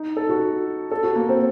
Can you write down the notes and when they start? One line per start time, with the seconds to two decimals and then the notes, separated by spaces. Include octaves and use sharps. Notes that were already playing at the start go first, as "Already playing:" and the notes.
Already playing: D#4
0.17 A4
0.29 F#4
0.91 A4
1.03 F#4
1.16 A#3
1.29 C4